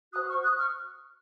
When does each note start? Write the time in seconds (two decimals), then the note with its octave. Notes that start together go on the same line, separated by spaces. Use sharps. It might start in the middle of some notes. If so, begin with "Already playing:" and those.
0.12 F#4 D#6 F#6
0.18 C5
0.28 C#6 F6
0.42 D#6 F#6
0.57 C#6 F6